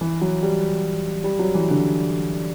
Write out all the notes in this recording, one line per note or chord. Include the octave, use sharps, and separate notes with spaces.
E3
F#3
G3
G3
F#3
E3
D3